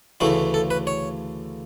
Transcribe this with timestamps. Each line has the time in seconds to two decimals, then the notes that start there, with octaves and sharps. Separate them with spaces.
0.20 D2 C#3 E3 A3 E4
0.54 A4
0.71 B4
0.87 C#5